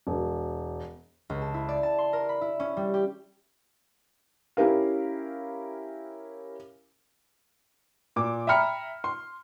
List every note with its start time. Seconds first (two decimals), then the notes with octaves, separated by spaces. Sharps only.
0.07 E1
1.30 C#2
1.42 A5
1.54 E4
1.68 D5
1.83 A5
1.98 C6
2.13 A#4
2.29 B5
2.41 E4
2.60 C#4
2.77 G3
2.94 G4
4.57 C#4 E4 G4 A#4 F5
8.16 A#2 D6
8.47 E5 G5 A#5 B5 F6 C#7
9.04 C6